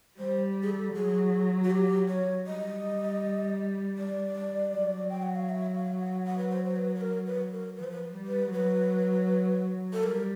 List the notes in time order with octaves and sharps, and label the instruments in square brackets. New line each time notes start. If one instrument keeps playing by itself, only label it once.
[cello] G3 [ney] C5
[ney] G#4
A4
[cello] F#3 [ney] G#4
[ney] F#4
G4
C#5
[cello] G3 [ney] D#5
[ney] D5
[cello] F#3
[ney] G5
F#5
F5
E5
F5
F#5
F#5
B4
C5
C5
B4
B4
A#4
B4
A#4
[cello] F3 [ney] B4
[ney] C5
B4
[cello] G3
[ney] B4
[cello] F#3 [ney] B4
[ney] A4
[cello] G3 [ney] A#4